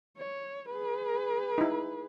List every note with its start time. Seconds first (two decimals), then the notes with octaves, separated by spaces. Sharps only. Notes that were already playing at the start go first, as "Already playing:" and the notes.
0.17 C#5
0.69 G#4 B4
1.58 D#4 E4